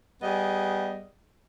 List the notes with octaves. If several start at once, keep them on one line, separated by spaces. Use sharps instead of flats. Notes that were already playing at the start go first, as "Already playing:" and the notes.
G3 B3 G#4 D#5